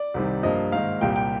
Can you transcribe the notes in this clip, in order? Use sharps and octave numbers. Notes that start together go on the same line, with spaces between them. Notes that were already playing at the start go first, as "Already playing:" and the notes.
Already playing: D5
C2 C3 D#3 G3
G2 F3 A#3 D#5
G#2 D#3 A#3 F5
C2 A#2 G3 A#3 G5
G5